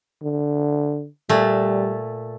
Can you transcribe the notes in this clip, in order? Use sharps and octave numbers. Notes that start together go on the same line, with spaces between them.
D3
A#2 G3 A3